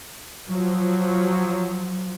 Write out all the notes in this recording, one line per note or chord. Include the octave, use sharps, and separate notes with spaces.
F3 F#3